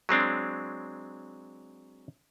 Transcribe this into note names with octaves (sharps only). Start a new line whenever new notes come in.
F#3 G#3 C4 D4